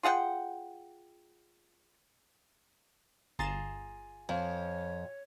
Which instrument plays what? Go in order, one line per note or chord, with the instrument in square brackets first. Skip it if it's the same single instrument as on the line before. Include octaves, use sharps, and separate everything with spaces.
[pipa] F4 G#4 F#5 G5
[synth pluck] G1 A6 E7 [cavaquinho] F4 G#4 A#5
[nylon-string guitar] F2 [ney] C#5